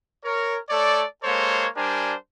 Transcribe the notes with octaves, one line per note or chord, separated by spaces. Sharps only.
A#4 C#5
A3 A4 C#5 D5
G#3 A#3 A4 C5 C#5
G3 D4 G4 A#4 C5 G#5